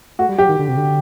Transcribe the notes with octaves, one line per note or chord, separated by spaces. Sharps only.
A3 F#4
G3
F#3 G4
D#3
D3
C3
D3